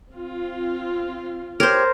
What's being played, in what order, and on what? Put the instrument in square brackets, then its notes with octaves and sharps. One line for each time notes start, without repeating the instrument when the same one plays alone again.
[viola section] C4 F4
[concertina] G4 C#5 [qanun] A#4 C5